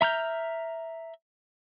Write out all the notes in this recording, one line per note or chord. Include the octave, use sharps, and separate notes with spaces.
E5 A#5 F6 G6